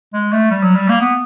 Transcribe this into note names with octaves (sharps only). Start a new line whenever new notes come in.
G#3
A3
G3
F#3
G3
A#3
B3